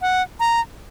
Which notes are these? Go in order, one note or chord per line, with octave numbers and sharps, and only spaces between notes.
F#5
A#5